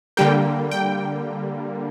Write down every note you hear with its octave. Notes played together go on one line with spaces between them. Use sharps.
D3 G3 A#3 G5
G5